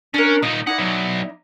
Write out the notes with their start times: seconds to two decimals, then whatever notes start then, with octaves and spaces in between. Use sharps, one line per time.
0.14 C#4 D4 A#4
0.43 A#2 D#4 D#5
0.67 D#4 E4 D5 F#5
0.78 F#3 B3